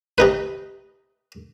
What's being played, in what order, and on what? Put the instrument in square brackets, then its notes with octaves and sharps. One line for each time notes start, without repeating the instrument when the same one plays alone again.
[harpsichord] C3 D#4 B4